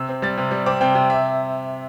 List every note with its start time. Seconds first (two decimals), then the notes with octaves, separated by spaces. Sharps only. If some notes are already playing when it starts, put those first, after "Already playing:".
Already playing: C3 E6
0.09 C4
0.22 G3 A6
0.38 C3
0.51 G3
0.66 C4 D6
0.81 C3 G5
0.95 C3
1.10 E5